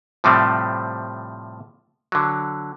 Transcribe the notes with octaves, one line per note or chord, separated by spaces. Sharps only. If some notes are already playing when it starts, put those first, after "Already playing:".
A2 C3 F3 G3 A3 C4
D3 F#3